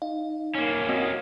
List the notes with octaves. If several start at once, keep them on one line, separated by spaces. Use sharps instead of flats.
D#4 F5
A#3 C#4
C4 F#4 D#5